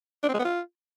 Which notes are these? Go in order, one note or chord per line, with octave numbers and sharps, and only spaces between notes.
D4
C4
G#3
B3
F4